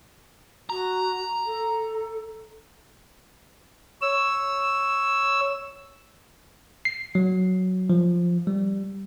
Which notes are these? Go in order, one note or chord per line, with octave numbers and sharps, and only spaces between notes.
F#4 A#5
A4
C#5 E6
C7
F#3
F3
G3